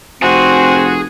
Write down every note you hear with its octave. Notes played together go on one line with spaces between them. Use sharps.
F1 C4 F#4 G#4